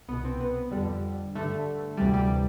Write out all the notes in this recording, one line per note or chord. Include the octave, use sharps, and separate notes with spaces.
C2 B2 B3
C4
B3
F2 D3 G3
G2 D3 A3
D2 C3 E3 G3
G3